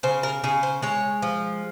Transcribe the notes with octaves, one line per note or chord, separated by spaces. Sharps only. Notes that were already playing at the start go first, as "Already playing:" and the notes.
C#3 C5
A#4
C#3 G#4
C5
G#3 C#5
F3